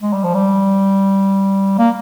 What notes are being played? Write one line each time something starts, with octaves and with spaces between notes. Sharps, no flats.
G#3
G3
F3
G3
A#3